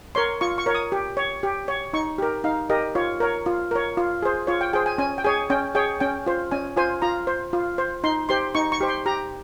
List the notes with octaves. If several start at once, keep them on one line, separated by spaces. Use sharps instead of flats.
A#4 C#5 C6
F4 C#6
C#6
A#4 C#5
D#6
G4
C#5
G4
C#5
D#4 C#6
G4 A#4
D#4 F5
G4 A#4 D#5
F4 C#5
A#4 C#5
F4
A#4 C#5
F4
G#4 C5
F4 C#5
G5
G#4 C5 G5
G#5
C#4 G#5
G5
G#4 C#5 G#5
C#4 G5
G#4 C#5 G5
C#4 G5
F4 C5
C#4 G#5
F4 C5 G#5
F4 A#5
C5
F4
C5
D#4 C6
G4 C5 C6
D#4 C#6
C#6
G4 C5
C6
G4 A#5